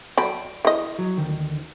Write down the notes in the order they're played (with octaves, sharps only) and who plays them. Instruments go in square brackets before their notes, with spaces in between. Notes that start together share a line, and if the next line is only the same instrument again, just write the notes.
[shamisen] F#3 A4 B5 [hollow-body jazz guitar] D5 G5
[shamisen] E3 D#5
[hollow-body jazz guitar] F#3
D2 D#3